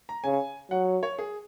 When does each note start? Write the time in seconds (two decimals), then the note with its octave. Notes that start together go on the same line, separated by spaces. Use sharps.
0.09 A#5
0.24 C#3 G#5
0.71 F#3 F#5
1.03 C#5
1.18 G#4